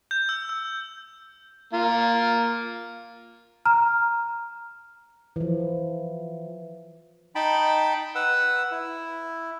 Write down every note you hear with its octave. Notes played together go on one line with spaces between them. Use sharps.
G6
E6
E6
A#3 F4
A#5 F6
E3 F3
D#4 G5 A5 B5
B4 F#5 E6
E4